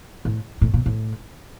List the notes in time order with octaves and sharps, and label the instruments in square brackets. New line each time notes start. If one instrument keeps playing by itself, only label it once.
[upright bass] A2
A2
A#2
A2